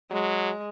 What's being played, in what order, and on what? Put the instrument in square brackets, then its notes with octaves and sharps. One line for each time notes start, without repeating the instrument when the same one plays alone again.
[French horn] F#3 [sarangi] G#3